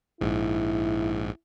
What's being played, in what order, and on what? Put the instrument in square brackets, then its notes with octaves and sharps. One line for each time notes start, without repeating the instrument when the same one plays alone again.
[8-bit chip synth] A#1 G#2 [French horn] E4